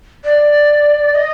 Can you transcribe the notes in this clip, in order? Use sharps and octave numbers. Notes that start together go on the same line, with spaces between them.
D5
D#5